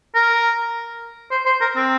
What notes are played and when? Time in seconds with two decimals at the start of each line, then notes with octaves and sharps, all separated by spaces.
0.15 A#4
1.31 C5
1.46 C5
1.61 A#4
1.75 C4